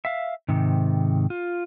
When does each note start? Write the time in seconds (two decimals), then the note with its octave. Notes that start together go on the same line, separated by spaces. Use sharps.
0.05 E5 F5
0.48 G#2 C3 D#3
1.30 F4